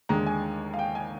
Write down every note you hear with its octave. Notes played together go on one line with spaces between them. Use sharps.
D#2 D3 G#3 A#5
G#5
F5
G5
G#5